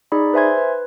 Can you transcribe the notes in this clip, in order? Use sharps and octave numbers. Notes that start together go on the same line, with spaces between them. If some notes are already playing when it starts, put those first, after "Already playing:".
D#4 G#4 D5 B5
B4 C5 E5 G#5 C6 G#6
B4